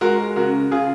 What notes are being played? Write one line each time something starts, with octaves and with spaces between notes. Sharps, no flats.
G#3 F#4 A#4
C#3 F#4 A#4
C#3 F4 G#4